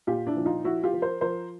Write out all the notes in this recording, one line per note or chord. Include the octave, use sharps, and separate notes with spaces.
A#2 F4 G4
D4 E4
F3
D#4 F4
F3 E4 F#4
F4 G4
F3
A#4 C5
F3 A#4 C5